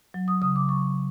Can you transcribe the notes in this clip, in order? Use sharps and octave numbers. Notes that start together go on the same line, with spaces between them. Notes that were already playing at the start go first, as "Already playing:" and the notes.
F#3
D#6
C#3 D#6
D6
F#3 C#6